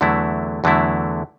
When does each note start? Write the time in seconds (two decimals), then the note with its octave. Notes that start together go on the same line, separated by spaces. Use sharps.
0.01 E2 D3 F#3 A3 E4
0.64 E2 D3 F#3 A3 E4